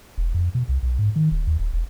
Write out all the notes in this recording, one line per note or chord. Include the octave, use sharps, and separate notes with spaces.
E1
F2
B2
C2
B1
G#2
D#3
D#1
D#2
D#1
E1